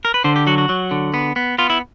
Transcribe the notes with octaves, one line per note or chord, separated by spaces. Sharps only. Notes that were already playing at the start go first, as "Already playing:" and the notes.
A#4
B4
D3 C5
G4
F#3 F#4
F#4
F#3
D3
B3
B3
B3 F4
E4